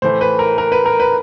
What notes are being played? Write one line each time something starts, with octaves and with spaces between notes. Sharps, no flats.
A2 E3 A3 C5
B4
A#4
A#4
B4
A#4
B4